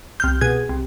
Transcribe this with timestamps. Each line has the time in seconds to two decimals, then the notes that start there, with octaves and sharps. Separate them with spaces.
0.20 C2 F6 G6
0.41 B2 G#4 G#6
0.69 C2